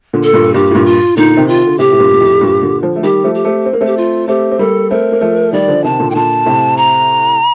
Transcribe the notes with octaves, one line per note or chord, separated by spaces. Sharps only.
A#2 D3
A4
G2 A#2
G2 A#2 G4
A2
G2 A#2
F4
A#2 D3 D#4
C3 D#3
F4
D3
A2 C3 G4
A2
G2 A#2
A#2
F2 A2
G2 A#2
A#2 D3
D3 F3
A3
D#3 G3 G4
F3 A3
G4
A3 C4
C4
A#3
A3 C4
G4
F4
A3 C4 G4
C4
G3 A#3 A4
A3 C4 A#4
A#3
F3 A3
D#3 G3 D5
D3 F3
C3 D#3 A5
A#2 D3
D#3 G5
A#2 D3 A5
A2 C3
A#5